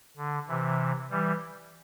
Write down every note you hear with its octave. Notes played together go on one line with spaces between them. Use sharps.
D3
C3 E3
E3 G3